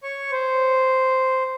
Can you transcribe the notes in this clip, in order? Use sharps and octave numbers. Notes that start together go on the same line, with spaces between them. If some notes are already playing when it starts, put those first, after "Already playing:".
C#5 C#6
C5